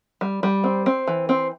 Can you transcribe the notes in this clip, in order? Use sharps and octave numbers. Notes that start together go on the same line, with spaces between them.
G3
G3
C4
C4
E3
C4